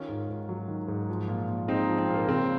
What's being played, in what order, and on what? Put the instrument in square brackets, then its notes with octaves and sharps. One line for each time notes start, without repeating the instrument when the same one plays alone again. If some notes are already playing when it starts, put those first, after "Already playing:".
Already playing: [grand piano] D#3 C#4 F4
G#2
G#2
F#3
D#3
G#2
F3
A#2
A#2
G#3 C4 D#4
F3
C4
A#2
A#3
C#3 C4